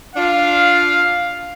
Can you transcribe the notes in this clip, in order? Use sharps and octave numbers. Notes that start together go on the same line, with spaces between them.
D4 F4 F5